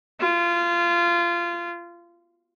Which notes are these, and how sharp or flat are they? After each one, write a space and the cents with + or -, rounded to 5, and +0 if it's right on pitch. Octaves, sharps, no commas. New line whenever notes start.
F4 -20